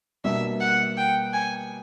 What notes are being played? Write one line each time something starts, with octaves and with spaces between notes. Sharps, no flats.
B2 G3 A#3 D4 E5
F#5
G5
G#5